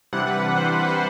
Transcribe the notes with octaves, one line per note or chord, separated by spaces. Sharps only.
C3 E3 G3 D4 F#5
B4
B4
C3 E3 G3 D4 C5
C5
B4
C5